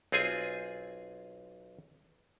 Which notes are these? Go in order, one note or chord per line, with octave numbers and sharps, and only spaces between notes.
B1 C4 F4 G#4 G#5